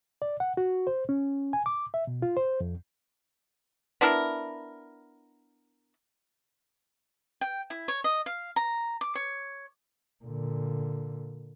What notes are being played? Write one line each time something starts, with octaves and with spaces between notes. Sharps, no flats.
D5
F#5
F#4
C5
C#4
G#5
D6
E5
B2
F4
C5
F2
B3 D4 E4 A#4
G5
E4
C#5
D#5
F5
A#5
D6
C#5
A#2 D3